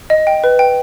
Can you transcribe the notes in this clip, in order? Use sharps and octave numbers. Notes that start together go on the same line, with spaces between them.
D#5
G5
B4
G5